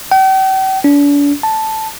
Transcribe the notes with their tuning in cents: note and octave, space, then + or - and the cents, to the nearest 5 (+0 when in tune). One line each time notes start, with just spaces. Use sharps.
G5 -45
D4 -40
A5 +0